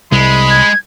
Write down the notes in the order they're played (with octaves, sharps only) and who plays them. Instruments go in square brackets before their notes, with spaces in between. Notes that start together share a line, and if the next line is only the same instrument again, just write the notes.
[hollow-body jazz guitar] C2 [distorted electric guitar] G#3 [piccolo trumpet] B5
[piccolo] G#6